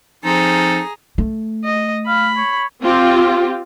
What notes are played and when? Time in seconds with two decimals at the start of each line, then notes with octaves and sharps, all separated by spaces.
0.24 F3 C4 D#4 G#4 A4 A#5
1.18 A3
1.65 D#5
2.07 F5 B5
2.37 C#5
2.83 C4 F4 G4